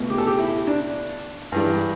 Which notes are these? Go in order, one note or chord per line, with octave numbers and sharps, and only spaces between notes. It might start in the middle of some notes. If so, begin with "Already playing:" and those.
Already playing: C#2 B2 A3
G4
A4
G4
E4
D4
G2 E3 G3